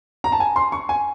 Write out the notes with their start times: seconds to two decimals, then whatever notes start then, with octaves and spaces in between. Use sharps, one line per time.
0.24 A#5
0.32 A5
0.40 G#5
0.56 C6
0.72 C#6
0.89 G#5